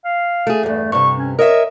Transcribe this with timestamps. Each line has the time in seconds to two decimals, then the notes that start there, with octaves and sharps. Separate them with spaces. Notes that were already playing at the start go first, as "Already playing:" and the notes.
0.04 F5
0.47 A3 G#4
0.63 E2 G2 A3
0.92 G2 C3 C#6
1.17 C#4
1.39 A#4 C#5 D#5 E5